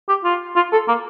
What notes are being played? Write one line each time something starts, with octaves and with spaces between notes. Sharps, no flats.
G4
F4
F4
A4
A#3